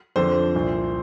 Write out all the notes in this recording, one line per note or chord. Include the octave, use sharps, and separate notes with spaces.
F2 D3 F3 C5
C2 A#2 F3